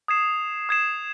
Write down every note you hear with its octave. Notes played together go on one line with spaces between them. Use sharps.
D#6 G#6 C7 E7
D#6 G#6 C7 E7